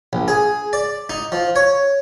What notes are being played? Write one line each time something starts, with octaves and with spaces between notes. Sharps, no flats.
A#1
G#4
D5
D#4
F3
C#5